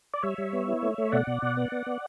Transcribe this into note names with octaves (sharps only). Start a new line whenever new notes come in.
D5
G3 C#5 E5
G3
B3
E4
A3
A3
B2 D5 F#5
B2
B2
B3
B3
B3